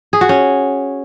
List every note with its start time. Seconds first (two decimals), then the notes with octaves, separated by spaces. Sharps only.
0.13 G#4
0.21 F#4
0.29 C#4